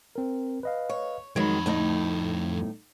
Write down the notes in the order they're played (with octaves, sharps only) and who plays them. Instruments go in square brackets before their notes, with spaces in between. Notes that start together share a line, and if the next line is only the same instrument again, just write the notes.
[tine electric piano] C4 A#4
B4 D#5 F5
[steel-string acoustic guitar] C#5
[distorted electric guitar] F2 B5 [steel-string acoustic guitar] D#3 F#3 G#3 [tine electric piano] G#6
[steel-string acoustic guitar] D2 A2 D#4